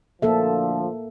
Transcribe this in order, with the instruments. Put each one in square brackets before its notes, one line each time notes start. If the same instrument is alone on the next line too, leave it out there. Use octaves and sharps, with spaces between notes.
[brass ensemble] D2 D3 F3 [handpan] A#3 A4 E5